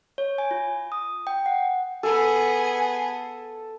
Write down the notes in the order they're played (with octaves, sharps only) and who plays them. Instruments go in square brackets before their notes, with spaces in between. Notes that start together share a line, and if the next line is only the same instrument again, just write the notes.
[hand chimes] C#5
G#5
F4
D#6
G5
F#5
[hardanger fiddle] B3 G#4 [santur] A4 [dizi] G#5